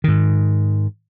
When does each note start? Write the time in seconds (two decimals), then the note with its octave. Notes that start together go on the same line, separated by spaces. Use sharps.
0.04 G#2 D#3